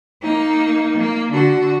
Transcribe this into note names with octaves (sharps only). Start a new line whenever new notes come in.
A#3 D#4
A#3
D3 F#4